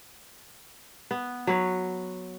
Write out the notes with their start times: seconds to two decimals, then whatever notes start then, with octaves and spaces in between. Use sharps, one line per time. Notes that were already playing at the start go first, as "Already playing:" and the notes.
1.11 B3
1.47 F#3 B4 C#5